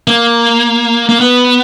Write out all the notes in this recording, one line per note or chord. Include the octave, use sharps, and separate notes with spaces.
A#3
A#3
B3